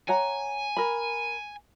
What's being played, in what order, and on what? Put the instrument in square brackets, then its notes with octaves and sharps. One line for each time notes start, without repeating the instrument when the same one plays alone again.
[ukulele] C#5 F#5 A#5 [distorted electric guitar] G#5
[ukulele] A#4 B5